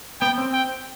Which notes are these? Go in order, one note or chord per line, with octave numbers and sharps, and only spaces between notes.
B3 G5
C4
G5